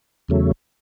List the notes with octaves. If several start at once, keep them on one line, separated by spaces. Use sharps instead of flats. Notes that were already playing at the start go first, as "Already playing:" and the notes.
E2 C#3 F#3 A3